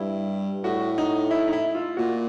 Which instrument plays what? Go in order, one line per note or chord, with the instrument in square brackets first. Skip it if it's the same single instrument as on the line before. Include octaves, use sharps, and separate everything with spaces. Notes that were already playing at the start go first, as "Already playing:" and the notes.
Already playing: [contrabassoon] G2 [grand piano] E4
[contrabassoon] A2 [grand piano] F#4
[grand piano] D#4
E4
D#4
E4
F4
[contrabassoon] A#2 [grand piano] F#4